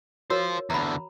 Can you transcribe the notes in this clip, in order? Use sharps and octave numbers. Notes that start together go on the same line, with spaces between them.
F4 F#4 A#4 C5 C#5
E2 D3 A#5 B5